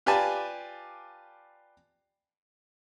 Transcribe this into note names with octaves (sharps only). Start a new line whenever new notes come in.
F4 G4 B4 D5 G#5 A5